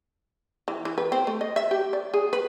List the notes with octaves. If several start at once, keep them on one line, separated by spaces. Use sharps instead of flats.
E3
E3
B4
C4
A3
D#5
E5
G4
D5
G#4
B4